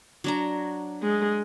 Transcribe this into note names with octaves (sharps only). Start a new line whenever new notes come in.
F#3 D4 A#5
G#3